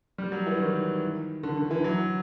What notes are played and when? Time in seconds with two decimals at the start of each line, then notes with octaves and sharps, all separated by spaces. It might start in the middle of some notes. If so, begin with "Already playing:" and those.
0.18 G3
0.32 F#3
0.46 E3
0.60 D#3
1.43 D3
1.57 D3
1.71 E3
1.84 F#3